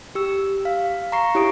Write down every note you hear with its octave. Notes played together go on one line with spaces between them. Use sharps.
G4 E6
F5
A#5 C#6 C7
E4 G4 C#5 D#6 D7